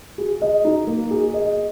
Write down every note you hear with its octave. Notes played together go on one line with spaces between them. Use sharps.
G#4
D#5
D#4
A#3
G#4
D#5